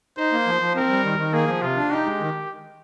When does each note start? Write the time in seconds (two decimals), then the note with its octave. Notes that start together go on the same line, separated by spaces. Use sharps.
0.17 D#4 C5
0.32 A#3
0.47 F3
0.61 F3
0.75 C4 A#4
0.90 G3
1.04 D#3
1.19 D#3
1.33 A#3 G#4
1.48 F3
1.62 C3 F4
1.77 D4
1.91 D#4 G4
2.06 G#3
2.20 D#3